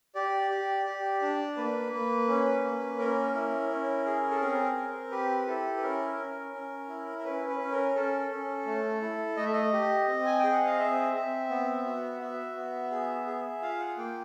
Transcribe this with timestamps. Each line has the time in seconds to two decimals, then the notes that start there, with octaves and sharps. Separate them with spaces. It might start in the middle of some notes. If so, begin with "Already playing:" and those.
0.15 G4 D5
0.50 G4
0.86 G4
1.22 D4
1.57 A#3 B4
1.92 A#3
2.28 C#4
2.64 A#3
2.99 C#4 A#4
3.34 E4
3.70 C#4
4.06 G#4
4.31 A4
4.40 C4 A#4
4.76 C4
5.11 G4 B4
5.47 E4 A4
5.77 B4
5.82 C#4 A#4
6.18 C#4
6.53 C#4
6.89 E4
7.18 A#4
7.24 C#4 B4
7.48 B4
7.59 C#4
7.72 A#4
7.95 C#4 A4
8.30 C#4
8.66 A3
9.01 E4
9.37 A3 D#5
9.45 E5
9.53 D#5
9.73 G4
10.08 C4
10.26 G#5
10.39 G#4 G5
10.52 F#5
10.65 F5
10.79 C4 E5
11.14 C4
11.50 B3
11.85 F#4
12.20 F#4 E5
12.56 B3
12.91 G#4
13.27 G#4
13.62 F4 F5
13.80 F#5
13.97 A#3 G5